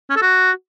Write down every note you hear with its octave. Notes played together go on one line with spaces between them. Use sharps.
C#4
A4
F#4